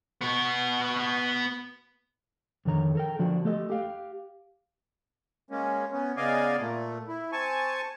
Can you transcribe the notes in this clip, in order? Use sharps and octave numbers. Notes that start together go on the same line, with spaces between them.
B3 F#4
F2 D3 D#3 C#5 A#5
A4 A#4 G5
D3 F3 D4 F#4
A3 G4 A4 D#5
G4 F5 G5
G#3 A#3 C#4
B3 C#4
C#3 B3 D5 D#5 F5 G#5
A#2 A3
E4
C4 G#5 A5 C#6